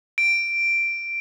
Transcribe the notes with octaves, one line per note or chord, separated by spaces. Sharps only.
D7